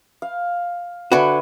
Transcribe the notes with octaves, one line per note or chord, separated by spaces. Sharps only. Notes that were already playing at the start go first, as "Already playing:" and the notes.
F5
D3 F#4 B4 E5 G#5